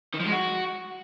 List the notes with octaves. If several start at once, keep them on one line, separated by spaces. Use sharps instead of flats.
D#3
F3
G#3
F#4